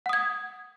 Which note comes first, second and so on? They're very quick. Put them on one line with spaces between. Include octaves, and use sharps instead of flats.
F#5 D#6 G#6